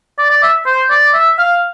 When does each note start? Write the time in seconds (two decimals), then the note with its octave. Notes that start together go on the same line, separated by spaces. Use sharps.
0.18 D5
0.31 D5
0.43 E5
0.66 C5
0.90 D5
1.14 E5
1.39 F5